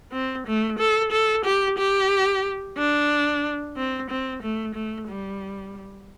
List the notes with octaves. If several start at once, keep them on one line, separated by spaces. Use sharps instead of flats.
C4
A3
A4
A4
G4
G4
D4
C4
C4
A3
A3
G3